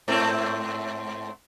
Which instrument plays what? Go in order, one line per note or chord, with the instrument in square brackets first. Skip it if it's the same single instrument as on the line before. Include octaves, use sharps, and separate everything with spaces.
[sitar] G#2 A3 C4